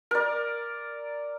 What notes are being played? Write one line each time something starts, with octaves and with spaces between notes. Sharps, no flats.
A#4 D5